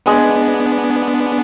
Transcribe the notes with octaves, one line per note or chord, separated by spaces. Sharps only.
G#3 B3 D4